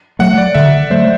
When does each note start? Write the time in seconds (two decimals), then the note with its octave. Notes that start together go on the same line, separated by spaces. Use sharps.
0.19 F#3 A3 F#5
0.38 D5
0.55 D3 E5
0.90 F#3 A3 C5